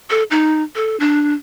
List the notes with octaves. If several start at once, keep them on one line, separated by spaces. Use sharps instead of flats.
A4
D#4
A4
D4